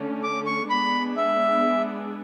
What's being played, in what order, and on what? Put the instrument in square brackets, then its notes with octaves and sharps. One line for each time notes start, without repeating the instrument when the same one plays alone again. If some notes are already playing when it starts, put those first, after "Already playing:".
Already playing: [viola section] D3 A3 C#4
[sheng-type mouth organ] D6
C#6
[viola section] G#3 B3 D4 G#4 [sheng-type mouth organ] B5
[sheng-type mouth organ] E5